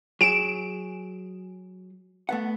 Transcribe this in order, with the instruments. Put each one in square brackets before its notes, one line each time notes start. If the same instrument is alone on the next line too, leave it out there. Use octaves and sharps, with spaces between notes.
[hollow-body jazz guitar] F#3 G#4 [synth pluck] D7 E7
[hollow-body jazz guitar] A3 B3 F#5